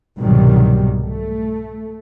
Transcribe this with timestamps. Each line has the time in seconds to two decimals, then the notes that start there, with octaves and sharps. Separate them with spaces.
0.17 C2 G#2 B2 D#3 F#3 G3
1.02 A3